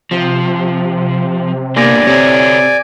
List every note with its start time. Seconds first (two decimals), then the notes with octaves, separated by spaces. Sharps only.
0.11 C3 F3
1.77 A#3 B3 D4 G4 D5 G#5 A#6
2.07 C3 C4 A4 C#5